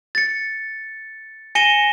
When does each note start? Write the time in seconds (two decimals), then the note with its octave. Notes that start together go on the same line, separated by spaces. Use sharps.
0.15 A6 C#7
1.55 G#5 A#6 C#7 D#7 E7 G7